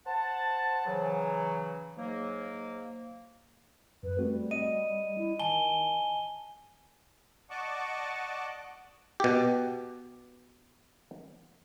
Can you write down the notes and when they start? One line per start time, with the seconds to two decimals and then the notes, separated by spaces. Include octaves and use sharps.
0.06 C5 F#5 A5
0.86 C#3 E3 F#3
1.97 G#2 F#3 A#3
4.03 F#2 B4
4.19 G3 A3 C4 F#4
4.51 D#5 D#7
5.17 E4
5.39 D#3 G#5 A5 G7
7.50 D5 D#5 F#5 A5 C#6 D6
9.20 B2 G4